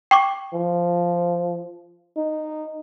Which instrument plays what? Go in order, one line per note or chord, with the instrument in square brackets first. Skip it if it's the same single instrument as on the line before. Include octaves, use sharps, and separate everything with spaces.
[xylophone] G5 C#6 D6
[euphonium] F3
D#4